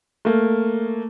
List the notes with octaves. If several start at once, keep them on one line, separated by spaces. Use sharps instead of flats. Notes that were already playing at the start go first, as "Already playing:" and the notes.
A3 A#3